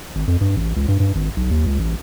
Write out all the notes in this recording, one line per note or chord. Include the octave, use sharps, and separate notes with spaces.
G#1
F2
G2
A1
C#2
G2
G2
G#1
B1
D#2
C#2
A1